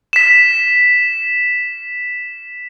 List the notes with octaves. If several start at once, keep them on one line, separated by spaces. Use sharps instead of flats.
B6 E7